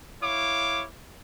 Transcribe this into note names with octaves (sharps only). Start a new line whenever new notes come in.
E4 C#5 F5 D6